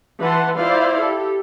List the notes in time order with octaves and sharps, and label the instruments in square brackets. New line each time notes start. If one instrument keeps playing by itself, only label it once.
[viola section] E3 B4 F#5 A5 C6
E4 F4 C5 D5 F5
G4 A4